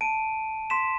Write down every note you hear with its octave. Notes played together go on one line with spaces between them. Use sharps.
A5 D7 D#7
C6 B6 E7